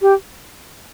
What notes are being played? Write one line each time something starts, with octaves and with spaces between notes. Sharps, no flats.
G4